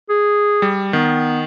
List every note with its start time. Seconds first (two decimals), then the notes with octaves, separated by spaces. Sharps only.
0.10 G#4
0.62 G3
0.93 D#3 B3